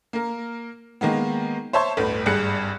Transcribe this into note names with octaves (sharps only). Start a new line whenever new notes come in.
A#3 A#4
D#3 G#3 A#3 B3
C5 C#5 E5 A5 C6 C#6
G1 D2 A2 B4
G#1 G2 G#4 F#6 C#7